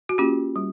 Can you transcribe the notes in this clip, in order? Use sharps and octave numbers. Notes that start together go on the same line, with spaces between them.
F#4
A#3 C#4 F4 G4
G3